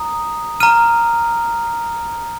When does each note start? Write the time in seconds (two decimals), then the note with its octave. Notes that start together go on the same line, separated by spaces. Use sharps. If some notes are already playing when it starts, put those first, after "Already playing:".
Already playing: A#5 D#6
0.60 A#5 F6 D#7